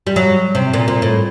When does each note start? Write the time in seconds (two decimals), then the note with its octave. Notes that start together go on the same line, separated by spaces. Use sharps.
0.07 G3
0.16 F#3
0.55 C3
0.73 A#2
0.88 A#2
1.02 A2